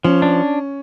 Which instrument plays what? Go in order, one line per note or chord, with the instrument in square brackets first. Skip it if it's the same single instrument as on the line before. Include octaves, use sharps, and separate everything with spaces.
[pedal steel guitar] F3 [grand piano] C#4
[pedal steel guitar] D4